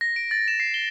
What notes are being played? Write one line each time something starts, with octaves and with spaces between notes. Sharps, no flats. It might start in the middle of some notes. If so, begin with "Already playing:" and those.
A#6
D7
A6
E7
C7
G7